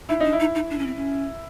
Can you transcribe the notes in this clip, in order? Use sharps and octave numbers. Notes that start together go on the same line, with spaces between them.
D#4 E4
D4 D#4
E4
D#4
D#4
D4
C#4
C4
C#4